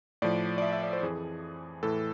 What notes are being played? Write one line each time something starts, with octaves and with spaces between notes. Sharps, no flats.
A2 F3 D5
D5
E5
E5
D5
C5
F2 E3 G#4
A2 E3 A4